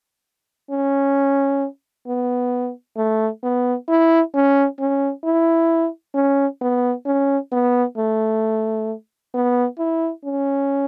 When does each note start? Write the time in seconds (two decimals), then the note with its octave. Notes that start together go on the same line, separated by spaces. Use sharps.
0.70 C#4
2.07 B3
2.97 A3
3.43 B3
3.89 E4
4.34 C#4
4.80 C#4
5.24 E4
6.15 C#4
6.61 B3
7.06 C#4
7.52 B3
7.97 A3
9.34 B3
9.79 E4
10.25 C#4